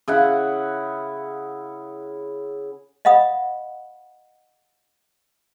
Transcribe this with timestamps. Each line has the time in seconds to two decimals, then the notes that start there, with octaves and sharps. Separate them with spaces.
0.08 C#3 E4 F#5
3.05 D#5 F5 F#5 B5 D#6